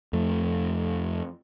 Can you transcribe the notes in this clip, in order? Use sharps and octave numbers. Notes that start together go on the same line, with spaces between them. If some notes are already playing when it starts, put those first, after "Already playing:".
F2 A3